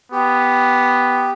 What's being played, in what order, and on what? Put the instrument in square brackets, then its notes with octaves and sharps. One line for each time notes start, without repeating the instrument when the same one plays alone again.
[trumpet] B3 [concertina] G4